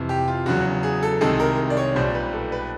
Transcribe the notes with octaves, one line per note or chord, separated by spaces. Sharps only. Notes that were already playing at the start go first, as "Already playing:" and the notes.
Already playing: F2 C3 E3
G4
F4
E2 C#3 F#3 F#4
G#4
A4
C2 C3 D#3 G#3 A4
A#4
D5
C#5
B1 A#2 G3 C5
B4
A4
B4